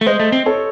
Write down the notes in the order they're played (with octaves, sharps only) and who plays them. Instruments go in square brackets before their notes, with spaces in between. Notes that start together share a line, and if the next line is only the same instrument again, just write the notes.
[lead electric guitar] A3
[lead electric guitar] G#3 [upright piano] C5 D#5
[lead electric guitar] A3
C4
[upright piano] A4 C#5